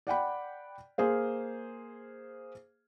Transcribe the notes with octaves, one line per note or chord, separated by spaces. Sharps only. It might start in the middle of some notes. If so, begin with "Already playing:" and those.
D5 F#5 G5 B5
A#3 G#4 C5 F5